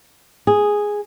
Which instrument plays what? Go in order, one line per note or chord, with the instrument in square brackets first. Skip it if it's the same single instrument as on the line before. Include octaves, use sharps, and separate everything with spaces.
[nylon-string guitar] G#4